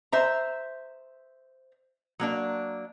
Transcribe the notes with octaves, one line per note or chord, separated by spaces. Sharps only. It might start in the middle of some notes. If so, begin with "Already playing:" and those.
C5 E5 A#5
F#3 A#3 D4